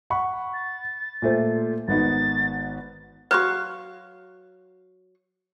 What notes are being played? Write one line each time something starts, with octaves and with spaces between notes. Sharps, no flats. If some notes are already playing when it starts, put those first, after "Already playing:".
F#5 B5 C#6
A6
A#2 A3 C5
G#1 B3 D#4 A6
F#3 F#4 B4 F5 C#6